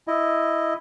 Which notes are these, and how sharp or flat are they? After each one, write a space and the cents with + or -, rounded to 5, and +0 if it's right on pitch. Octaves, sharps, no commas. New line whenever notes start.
E4 +0 D#5 +0